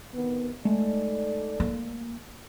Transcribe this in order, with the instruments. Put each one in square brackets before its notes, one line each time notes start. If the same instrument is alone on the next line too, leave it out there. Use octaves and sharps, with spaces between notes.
[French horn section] C3 D#3 B3
[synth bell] G#3 A3 [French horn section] D#4 A4 D5
[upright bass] A#3